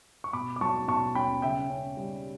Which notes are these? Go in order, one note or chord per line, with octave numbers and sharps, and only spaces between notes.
C#6
B2 B5 D6
D6
F#3 A5 C#6
B2 A5 C#6
C#4 G5 B5
C#3 E5 G5
C#4
G3